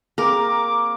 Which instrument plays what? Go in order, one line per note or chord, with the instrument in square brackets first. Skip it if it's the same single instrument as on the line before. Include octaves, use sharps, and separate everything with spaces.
[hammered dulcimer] A#3 C4 [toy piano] G#4 [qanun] A#4 [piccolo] D6